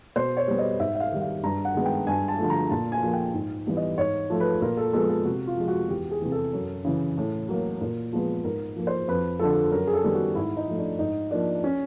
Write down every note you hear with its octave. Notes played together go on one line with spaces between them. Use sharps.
B2 C5
C#5
G3 B3
D#5
G#2 E5
E5
F5
D#3 G3
F5
G2 A#5
F#5
D#3 G#3 B3
G5
G2 G#5
A5
D3 F3 A3
A#5
A#2 A5
G#5
F3 A#3
G5
G#2
E3 G3 B3
D#5
G#2 C#5
F3 A3
B4
A#2 A#4
A4
F3 G#3 B3 A4
A4
C3 F#4
F4
F3 G#3
F#4
E2 G4
G#4
C3 E3
A4
F#2
C#3 E3
A2
F#3 A#3
A#2 A#4
F3 G#3 B3
G#2 A#4
F3 A#3
C5
F2 B4
D3 F3 A4
F#2 A#4
G#4
A4
D#3 G3 B3
F#4
G#2 E4
D#4
F3 A3
D4
G#2 D#4
F3 A#3 D4
C#4